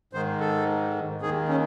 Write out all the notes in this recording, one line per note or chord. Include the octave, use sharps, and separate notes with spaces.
G#2 D#3 C5
A4
D#2 D#3 G#4
C#4